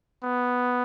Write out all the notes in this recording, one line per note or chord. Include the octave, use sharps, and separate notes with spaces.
B3